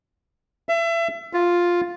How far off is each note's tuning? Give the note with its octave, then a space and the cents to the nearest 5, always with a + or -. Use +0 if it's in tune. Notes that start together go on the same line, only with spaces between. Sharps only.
E5 +30
F4 +5